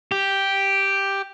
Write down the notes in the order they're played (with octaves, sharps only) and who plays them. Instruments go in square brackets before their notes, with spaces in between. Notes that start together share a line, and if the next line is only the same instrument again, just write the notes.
[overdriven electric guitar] G4